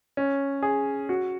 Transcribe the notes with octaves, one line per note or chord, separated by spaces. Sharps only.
C#4
G#4
F#4